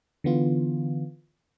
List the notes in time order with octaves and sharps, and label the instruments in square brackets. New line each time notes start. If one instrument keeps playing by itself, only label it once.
[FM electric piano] D3 E3 B3 F4